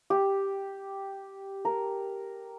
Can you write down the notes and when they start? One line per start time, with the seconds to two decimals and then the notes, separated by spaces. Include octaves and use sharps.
0.10 G4
1.65 A#4